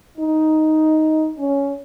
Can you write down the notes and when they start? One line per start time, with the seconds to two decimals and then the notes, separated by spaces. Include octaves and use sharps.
0.18 D#4
1.38 C#4